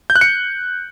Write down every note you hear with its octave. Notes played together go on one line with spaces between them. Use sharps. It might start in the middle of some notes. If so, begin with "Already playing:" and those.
G6
F#6
C#7